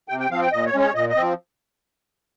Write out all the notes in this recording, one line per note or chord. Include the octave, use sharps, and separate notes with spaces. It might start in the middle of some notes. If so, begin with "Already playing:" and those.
C3 G5
G5
F3 C4 F5
G5
A#2 D#5
C#5
G#3 C#4
C#5
A#2 D#5
D#5
F3 C4